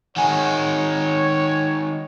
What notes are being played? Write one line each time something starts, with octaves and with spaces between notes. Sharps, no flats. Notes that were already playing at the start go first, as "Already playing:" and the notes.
D#3 G#3 C#5 F#5 G#5